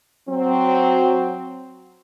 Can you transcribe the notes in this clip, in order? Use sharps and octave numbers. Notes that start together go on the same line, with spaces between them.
F#3 C4